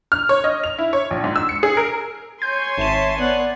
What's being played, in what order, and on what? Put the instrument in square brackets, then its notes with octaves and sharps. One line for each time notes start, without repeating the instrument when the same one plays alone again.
[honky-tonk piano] F6
C#5
D#5
F7
E4
C#5
A#1
G#2
E6
C#7
G#4
A#4
[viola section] C#5 G#5 C6 [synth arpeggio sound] G6
[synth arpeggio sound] G#1 D#7 [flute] E5 [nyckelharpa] A5
[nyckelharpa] B3 F#5 [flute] D5